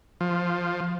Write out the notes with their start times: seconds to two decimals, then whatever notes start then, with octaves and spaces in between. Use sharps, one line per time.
0.21 F3